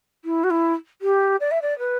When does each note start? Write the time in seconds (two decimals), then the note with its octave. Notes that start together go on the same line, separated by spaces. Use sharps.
0.24 E4
0.44 F#4
0.50 E4
1.01 G4
1.40 D5
1.51 E5
1.62 D5
1.79 B4